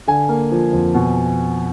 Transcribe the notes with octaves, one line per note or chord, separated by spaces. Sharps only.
D3 G#5
A#3
F3
F2
B2